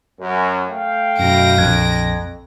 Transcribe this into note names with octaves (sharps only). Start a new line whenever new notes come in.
F#2
A3 F5 G5
F#2 B2 A#6 D7
A#1 F2 F#6 G#6